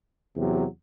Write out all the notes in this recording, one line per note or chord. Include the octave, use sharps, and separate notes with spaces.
E2 C3 F#3